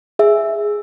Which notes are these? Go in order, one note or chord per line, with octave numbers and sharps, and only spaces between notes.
G#4 E5